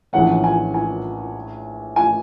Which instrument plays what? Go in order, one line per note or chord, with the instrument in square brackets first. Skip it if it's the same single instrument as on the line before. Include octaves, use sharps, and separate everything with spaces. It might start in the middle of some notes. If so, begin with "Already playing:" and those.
[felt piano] A#1 A2 E3 A3 C#4 [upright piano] F#5
[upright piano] G#5
G#5
G#5